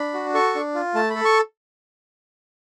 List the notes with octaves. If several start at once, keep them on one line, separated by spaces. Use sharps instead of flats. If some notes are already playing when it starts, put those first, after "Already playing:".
Already playing: D4 B5
F#4
A4 C#6
D4
F4
A3 A5
A4 B5
C#6